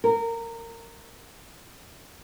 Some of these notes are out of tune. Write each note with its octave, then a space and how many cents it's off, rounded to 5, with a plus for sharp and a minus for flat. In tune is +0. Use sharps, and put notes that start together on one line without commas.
A#4 -20